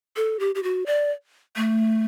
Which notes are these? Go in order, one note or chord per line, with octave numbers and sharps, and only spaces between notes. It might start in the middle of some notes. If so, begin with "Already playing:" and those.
A4
G4
G4
F#4
D5
A3